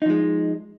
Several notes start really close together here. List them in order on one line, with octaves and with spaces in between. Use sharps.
D#4 F3 G#3